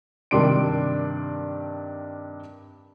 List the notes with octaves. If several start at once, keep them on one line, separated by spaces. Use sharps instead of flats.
G2 C3 D#3 D4 C6 D7